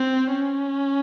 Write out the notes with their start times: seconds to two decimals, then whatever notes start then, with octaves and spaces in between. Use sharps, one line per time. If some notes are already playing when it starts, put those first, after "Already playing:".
Already playing: C4
0.31 C#4